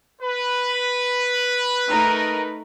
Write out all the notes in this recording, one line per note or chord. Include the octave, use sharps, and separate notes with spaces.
B4
A3 D#4 A#4